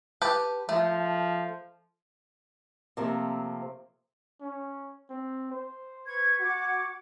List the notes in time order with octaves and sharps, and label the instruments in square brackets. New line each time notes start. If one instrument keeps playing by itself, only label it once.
[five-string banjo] G4 B4 A5
[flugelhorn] F3 [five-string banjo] A3
[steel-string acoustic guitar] C3 F3 A3 A#3 C4
[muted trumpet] C#4
C4
C5
[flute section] B4 C#6 G#6
[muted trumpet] F#4 [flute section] F#5 D6 G#6